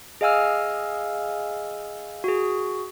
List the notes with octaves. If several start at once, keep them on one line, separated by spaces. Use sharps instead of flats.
G#4 D#5 F5 G#5 E6 F6
F#4 G#4